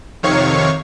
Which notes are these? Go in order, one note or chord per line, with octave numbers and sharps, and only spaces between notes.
F2 C3 D#3 C#5 F5 C#6